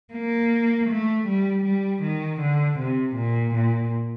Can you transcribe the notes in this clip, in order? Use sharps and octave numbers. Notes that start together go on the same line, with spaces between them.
A#3
A3
G3
G3
D#3
D3
C3
A#2
A#2